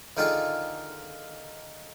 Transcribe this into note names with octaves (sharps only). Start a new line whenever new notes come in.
D3 D#3 D#4 F4 G#4 A4